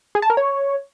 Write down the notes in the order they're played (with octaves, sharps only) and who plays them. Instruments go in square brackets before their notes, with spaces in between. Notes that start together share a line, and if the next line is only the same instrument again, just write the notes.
[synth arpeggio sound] G#4
A5
A#4
C#5